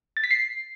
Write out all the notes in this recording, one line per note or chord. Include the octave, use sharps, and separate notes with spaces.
A6
B6
C7